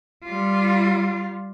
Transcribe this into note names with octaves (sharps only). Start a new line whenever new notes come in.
G3 F4